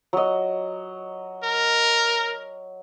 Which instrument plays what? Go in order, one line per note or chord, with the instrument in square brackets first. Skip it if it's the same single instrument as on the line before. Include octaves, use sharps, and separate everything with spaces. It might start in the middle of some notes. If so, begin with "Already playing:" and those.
[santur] F#3 D#5
[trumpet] A#4